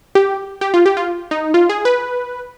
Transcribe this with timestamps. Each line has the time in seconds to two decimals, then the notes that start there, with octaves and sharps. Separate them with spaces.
0.15 G4
0.61 G4
0.74 F4
0.86 G4
0.97 F4
1.31 D#4
1.54 F4
1.69 G#4
1.85 B4